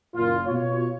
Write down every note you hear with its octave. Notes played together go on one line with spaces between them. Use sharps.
F#1 A#2 F4
B2 F4 C#5